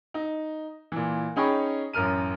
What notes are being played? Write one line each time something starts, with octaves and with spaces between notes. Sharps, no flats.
D#4
A#2 E3
C#4 D#4 G#4 G5 B5 C#6
A1 F#2 A#4 F6 D#7